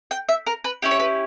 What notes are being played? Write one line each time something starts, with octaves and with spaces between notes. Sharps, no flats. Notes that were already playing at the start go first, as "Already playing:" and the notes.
G5
E5
A#4
B4
C#4 E4 G4
C#5
B4